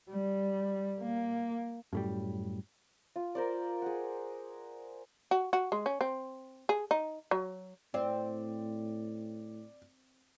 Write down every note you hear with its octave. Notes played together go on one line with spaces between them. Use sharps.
G3
A#3
F#2 A2 G3
F4
A#4 C5 D5
G#4 F#5
F#4
F#4
G#3
C#4
C4
G#4
D#4
F#3
A2 C4 D5